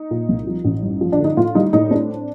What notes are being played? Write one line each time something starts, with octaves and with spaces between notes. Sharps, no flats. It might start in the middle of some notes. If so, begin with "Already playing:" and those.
Already playing: D#4
A#2
C2
F3
A1
G2
F3
D4
D3
D#4
A2 F4
G3 D#4
A2 D#4
C4 D4